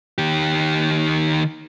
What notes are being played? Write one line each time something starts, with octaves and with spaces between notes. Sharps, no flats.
D#3 G4